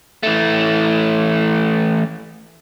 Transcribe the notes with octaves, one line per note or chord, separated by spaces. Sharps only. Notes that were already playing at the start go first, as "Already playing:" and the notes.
E3 A3